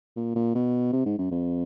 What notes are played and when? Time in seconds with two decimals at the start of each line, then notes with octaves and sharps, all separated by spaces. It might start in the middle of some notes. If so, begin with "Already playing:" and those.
0.16 A#2
0.35 A#2
0.55 B2
0.93 C3
1.06 G#2
1.18 F#2
1.31 F2